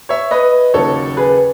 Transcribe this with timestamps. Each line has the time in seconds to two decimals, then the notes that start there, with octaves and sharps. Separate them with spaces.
0.09 C#5 E5
0.31 B4 D#5
0.74 D#2 C#3 F#3 A4 C#5
1.17 G#4 B4